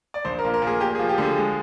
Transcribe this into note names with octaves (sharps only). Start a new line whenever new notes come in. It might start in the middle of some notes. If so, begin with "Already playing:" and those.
D5
A#1 C5
A#4
A#2
A#4
A#2
G#4
A#3 G4
G#4
F3
G4
D3 G#4
G#3